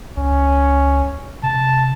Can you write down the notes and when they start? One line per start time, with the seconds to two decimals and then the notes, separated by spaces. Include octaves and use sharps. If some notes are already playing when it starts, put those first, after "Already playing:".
0.17 C#2 C#4
1.43 C3 A5